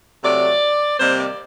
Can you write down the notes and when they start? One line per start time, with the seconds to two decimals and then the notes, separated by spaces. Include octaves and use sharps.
0.23 C3 F#3 A3 D5
1.00 C3 D#3 G3 A#3 C5
1.19 D5